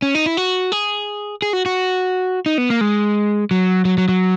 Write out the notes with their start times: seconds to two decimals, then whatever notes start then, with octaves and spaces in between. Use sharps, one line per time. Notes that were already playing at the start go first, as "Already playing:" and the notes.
0.02 C#4
0.15 D#4
0.26 E4
0.37 F#4
0.72 G#4
1.42 G#4
1.53 F#4
1.66 F#4
2.46 D#4
2.58 B3
2.70 A#3
2.81 G#3
3.51 F#3
3.85 F#3
3.98 F#3
4.09 F#3